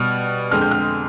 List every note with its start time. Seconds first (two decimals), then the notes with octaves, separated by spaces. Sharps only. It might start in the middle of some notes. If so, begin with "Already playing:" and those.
Already playing: B2 G3 F6
0.51 F2 D3 G#3 F6
0.61 G6
0.71 F6